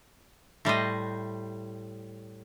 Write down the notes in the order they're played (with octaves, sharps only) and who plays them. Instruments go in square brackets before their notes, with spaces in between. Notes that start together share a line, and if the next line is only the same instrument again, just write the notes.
[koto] A2 G3 C5 D#5